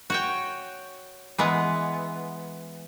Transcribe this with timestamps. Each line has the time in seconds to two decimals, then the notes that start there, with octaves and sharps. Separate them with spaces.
0.10 F#4 C#5 G5
1.38 E3 G#3 B3